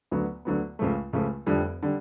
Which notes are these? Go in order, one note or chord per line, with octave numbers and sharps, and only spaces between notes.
D2 D3 F#3 B3
D2 D3 F#3 B3
C#2 C#3 F3 A3
C#2 C#3 F3 A3
F1 F2 D3 G3
D3 G3